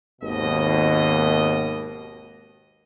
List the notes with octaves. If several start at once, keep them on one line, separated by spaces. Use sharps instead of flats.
G#1 D#2 B2 D#5